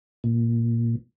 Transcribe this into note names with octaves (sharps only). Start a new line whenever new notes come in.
A#2